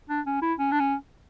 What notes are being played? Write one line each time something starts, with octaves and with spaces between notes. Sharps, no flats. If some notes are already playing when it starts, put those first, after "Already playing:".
D4
C#4
E4
C#4
D4
C#4